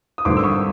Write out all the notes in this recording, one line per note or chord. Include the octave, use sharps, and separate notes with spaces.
D#6
G#1 G2 D3 C6 D6
E6
C#6 D#6